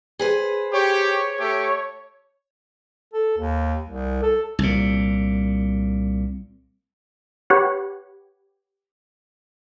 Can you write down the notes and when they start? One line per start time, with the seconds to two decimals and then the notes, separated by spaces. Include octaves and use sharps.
0.19 G#4 B4 C5
0.74 G4 C#5
1.40 A3 G4
3.14 A4
3.38 D#2
3.87 C2
4.23 A4
4.59 C2 A#2
7.50 G4 B4 C#5 F#5